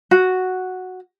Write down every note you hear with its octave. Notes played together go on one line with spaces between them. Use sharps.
F#4